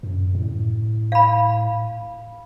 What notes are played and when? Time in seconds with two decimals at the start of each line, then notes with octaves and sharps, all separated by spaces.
0.03 F#2
0.35 A2
1.12 F5 B5